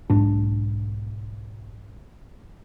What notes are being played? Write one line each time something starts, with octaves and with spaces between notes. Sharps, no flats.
B1 G#2 D4